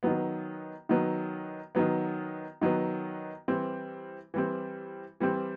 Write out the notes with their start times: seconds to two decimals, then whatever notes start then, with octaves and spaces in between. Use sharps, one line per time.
0.03 D#3 F#3 B3
0.89 D#3 F#3 B3
1.75 D#3 F#3 B3
2.61 D#3 F#3 B3
3.48 E3 G3 C4
4.34 E3 G3 C4
5.20 E3 G3 C4